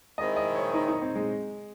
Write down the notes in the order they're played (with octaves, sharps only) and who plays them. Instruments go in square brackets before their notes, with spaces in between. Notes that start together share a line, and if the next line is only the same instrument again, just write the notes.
[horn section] D#3 G#3 C4 E4 [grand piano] D#5
[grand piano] D#5
C#5
D#4
D#4
C4
G#3